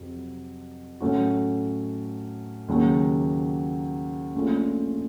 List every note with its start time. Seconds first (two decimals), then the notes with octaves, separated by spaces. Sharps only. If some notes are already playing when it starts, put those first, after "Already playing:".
Already playing: F2 C3 F#3
1.01 A2 F#3 A3 C#4 F#4
2.68 D#2 C#3 F#3 A#3
4.35 A#1 A#2 A3 C#4 F4